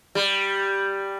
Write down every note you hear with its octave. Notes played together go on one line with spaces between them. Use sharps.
G3